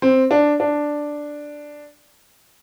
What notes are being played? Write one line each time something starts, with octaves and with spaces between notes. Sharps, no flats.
C4
D4
D4